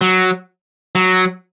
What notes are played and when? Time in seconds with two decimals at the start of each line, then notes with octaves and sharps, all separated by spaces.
0.01 F#3
0.95 F#3